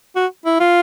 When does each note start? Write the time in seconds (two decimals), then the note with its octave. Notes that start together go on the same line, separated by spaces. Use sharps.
0.16 F#4
0.46 E4
0.60 F4